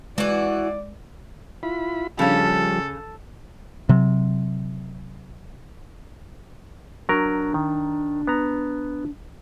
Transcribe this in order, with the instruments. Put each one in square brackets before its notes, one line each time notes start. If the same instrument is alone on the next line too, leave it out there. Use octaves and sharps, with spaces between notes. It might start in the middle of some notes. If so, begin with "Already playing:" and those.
[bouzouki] E3 F#4 [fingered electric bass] G#3 [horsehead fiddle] D5
[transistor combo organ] E4 F4 B5
[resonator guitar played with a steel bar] C#3 C#4 [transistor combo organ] F3 G3 [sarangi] A4
[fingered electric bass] C3 F#3
[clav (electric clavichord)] F#3 A#4 [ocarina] D4
[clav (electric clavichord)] D#3
B3 A#5